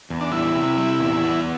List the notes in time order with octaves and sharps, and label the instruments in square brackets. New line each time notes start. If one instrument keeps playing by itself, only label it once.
[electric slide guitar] E2
[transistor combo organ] D4
[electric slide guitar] G3 [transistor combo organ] E4
[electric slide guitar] C3
G3
E2
B3